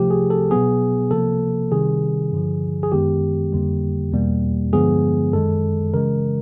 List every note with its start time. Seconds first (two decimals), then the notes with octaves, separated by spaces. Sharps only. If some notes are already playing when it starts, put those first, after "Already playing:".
Already playing: C3 F3 A3 G4
0.10 G#4
0.30 A4
0.51 B2 F#3 B3 G#4
1.11 C3 F3 A#3 A4
1.72 C3 D#3 G3 G#4
2.32 G2 D3 F3
2.83 G#4
2.92 F#2 D#3 G#3 B3 G4
3.53 F2 D3 G3 A#3
4.13 E2 B2 G3 A#3
4.73 G2 D3 F3 G#3 B3 G#4
5.33 F#2 D#3 G#3 A4
5.94 C#3 E3 G#3 A#4